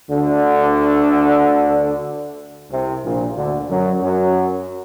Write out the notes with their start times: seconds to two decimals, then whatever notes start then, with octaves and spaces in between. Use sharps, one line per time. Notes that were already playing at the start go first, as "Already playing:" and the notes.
0.10 D2 D3
2.71 C2 C3
3.04 A#1 A#2
3.36 D2 D3
3.69 F#2 F#3
4.02 F#2 F#3